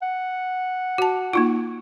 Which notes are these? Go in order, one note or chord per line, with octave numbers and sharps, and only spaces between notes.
F#5
F#4 A5
A#3 D#4 F4